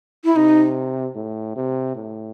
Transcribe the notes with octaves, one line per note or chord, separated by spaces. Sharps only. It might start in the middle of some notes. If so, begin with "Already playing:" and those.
E4
C3 D#4
A2
C3
A2